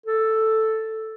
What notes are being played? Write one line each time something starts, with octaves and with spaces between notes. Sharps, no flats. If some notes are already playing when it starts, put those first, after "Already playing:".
A4